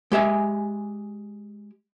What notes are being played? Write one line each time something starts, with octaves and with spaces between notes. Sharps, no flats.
G#3 G4 E5 G#5